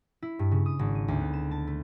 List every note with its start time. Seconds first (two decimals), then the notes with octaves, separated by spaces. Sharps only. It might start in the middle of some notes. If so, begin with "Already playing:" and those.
0.22 E4
0.39 G2
0.51 C#3
0.66 D#6
0.79 G#1
0.95 D#7
1.08 D2
1.21 B3
1.33 E7
1.51 A5
1.67 A3